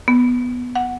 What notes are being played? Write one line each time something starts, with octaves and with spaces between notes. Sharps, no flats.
B3
F#5